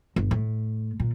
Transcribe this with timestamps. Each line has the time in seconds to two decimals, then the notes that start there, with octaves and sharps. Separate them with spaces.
0.16 G1
0.31 A2
1.00 A#2